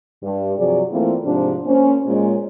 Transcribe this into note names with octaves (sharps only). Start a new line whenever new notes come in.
G2
C3 F3 F#3 G#4 D5
E3 A3 A#3 C4 E4 F4
G#2 C3 F3 D4
A#3 C#4 C5
A#2 G#3 C#5